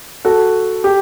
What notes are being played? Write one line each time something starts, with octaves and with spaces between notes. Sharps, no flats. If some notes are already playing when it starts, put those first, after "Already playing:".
F#4 A4
G4